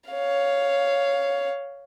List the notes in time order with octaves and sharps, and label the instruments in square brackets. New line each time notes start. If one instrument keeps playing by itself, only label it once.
[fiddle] C#5 F5